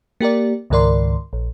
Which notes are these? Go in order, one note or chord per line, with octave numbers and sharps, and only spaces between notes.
A#3 G4 A#4 D5
C#2 G#2 D#3 A#4 D5 C6
A#1